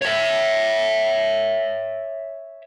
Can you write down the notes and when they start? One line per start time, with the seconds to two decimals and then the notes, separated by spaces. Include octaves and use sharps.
0.02 C#5 E5